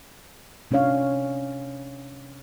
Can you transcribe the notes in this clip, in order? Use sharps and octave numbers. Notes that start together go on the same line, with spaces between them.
C3 C#4 D4 C#5 F5